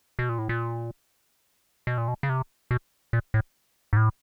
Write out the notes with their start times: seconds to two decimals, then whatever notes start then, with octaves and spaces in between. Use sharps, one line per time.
0.19 B2
0.29 A#2
0.39 A2
0.49 A#2
1.87 B2
1.98 A#2
2.08 B2
2.23 C#3
2.29 C3
2.71 B2
3.13 A#2
3.34 A2
3.93 G#2
3.97 A2